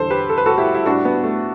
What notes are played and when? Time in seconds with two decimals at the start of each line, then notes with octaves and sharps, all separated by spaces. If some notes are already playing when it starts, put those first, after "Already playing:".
Already playing: E2 D3 G3 A4 C5
0.10 G4 B4
0.29 A4
0.38 B4
0.46 F#4 A4
0.58 E4 G4
0.75 E4
0.86 A2 G3 D4 F#4
1.05 B3
1.24 A3